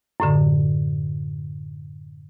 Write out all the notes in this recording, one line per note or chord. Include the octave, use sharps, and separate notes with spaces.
F#2 A2 D3